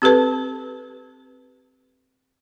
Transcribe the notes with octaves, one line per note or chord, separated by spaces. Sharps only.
C4 G4 A4 B4 A5